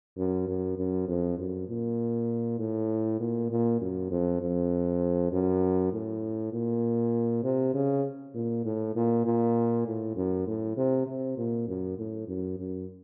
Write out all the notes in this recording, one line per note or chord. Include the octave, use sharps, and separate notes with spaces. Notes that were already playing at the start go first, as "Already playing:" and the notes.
F#2
F#2
F#2
F2
F#2
A#2
A2
A#2
A#2
F#2
F2
F2
F#2
A2
A#2
C3
C#3
A#2
A2
A#2
A#2
A2
F#2
A2
C3
C3
A#2
F#2
A2
F#2
F#2